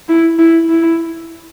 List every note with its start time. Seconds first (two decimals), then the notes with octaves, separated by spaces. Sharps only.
0.08 E4
0.38 E4
0.69 E4